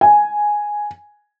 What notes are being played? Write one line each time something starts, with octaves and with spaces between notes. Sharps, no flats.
G#5